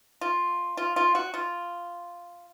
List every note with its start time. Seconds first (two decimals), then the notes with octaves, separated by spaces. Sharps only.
0.21 F4
0.77 F4
0.96 F4
1.15 F#4
1.34 F4